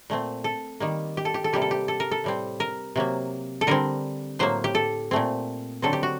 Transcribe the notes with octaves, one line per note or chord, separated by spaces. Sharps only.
A#2 A3 C4
A4
D#3 G3 A#3
G4
A4
G4
A4
C3 G3 A#3 G4
A4
G4
A4
A#4
A4
A2 G3 C4
A#4
C3 F#3 A#3
A4
D3 G3 C4 A#4
A2 F#3 A#3 C5
G4
A4
A#2 A3 C4
D3 F#3 C4 A4
G4
F#4